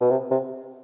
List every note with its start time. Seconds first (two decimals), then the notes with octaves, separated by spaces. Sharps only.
0.01 B2
0.10 C3
0.31 C3